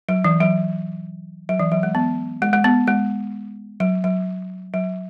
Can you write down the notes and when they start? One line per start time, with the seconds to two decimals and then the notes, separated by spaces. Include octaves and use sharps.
0.09 F#3
0.24 E3
0.41 F#3
1.49 F#3
1.59 E3
1.72 F#3
1.83 G#3
1.95 B3
2.42 G#3
2.53 G#3
2.64 B3
2.87 G#3
3.80 F#3
4.04 F#3
4.74 F#3